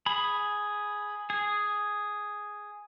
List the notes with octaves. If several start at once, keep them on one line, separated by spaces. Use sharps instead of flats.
G#4 B5
G#4